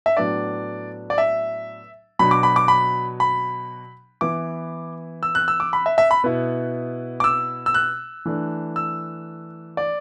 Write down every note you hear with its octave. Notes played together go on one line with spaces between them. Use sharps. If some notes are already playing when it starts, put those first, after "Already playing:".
E5
A2 F#3 B3 D4 D5
D5
E5
B2 F#3 D4 B5
D6
B5
D6
B5
B5
E3 B3 E4 D6
E6
F#6
E6
D6
B5
E5
E5
B5
B2 B3 E4
D6
E6
E6
F#6
E3 A3 D4
E6
D5